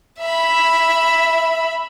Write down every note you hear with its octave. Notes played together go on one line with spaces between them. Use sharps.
E5 B5